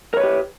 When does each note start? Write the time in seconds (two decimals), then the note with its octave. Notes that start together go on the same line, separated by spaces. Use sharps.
0.14 A#4
0.17 C#5
0.20 B4
0.24 G4